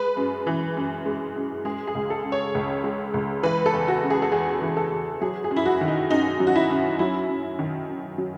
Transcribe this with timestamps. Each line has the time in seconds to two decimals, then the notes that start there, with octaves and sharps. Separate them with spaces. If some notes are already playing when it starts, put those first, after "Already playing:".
Already playing: G#3 B4
0.17 F#2
0.47 E3
0.77 F#2
1.06 G#3
1.36 F#2
1.65 G#3 G#4
1.87 G#4
1.95 C#2
2.10 A4
2.24 C#3
2.32 C#5
2.55 C#2
2.84 G#3
3.14 C#2
3.43 E3 B4
3.66 A4
3.73 E2
3.88 F#4
4.03 C#3
4.10 G#4
4.22 A4
4.32 E2 G#4
4.62 E3
4.77 A4
4.92 E2
5.21 F#3 G#4
5.44 G#4
5.51 F#2
5.56 E4
5.66 F#4
5.81 D#3
5.88 D#4
6.10 F#2 D#4
6.40 F#3
6.47 F#4
6.55 E4
6.70 F#2
6.99 F#3 E4
7.29 F#2
7.59 D#3
7.88 F#2
8.18 F#3